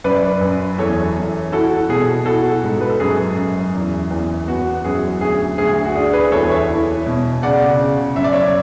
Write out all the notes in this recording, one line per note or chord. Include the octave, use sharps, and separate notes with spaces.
F#2 B4 D5
F#2
E2 A4 C#5
E2
E4 F#4 A4
B2 G#4
E4 F#4 A4
G#2
B4
A4
F#2 G#4
F#2
E2
E2
B3 F#4
F#2 G#4
D2 G#4
D2 G#4
F#4
D4 G#4
G#4 B4
E2 A4 C#5
C#5 E5
E4
B2
C#3 D5 F#5
C#3
F#2 E5
D5
C#5 E5